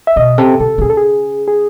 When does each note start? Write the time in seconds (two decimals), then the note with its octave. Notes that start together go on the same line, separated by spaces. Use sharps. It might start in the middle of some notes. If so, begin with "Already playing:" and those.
0.07 E5
0.16 B2 D#5
0.38 C3 A4
0.60 C3 A4
0.78 C3
0.82 C#3 G#4
0.90 A4
0.97 G#4
1.48 G#4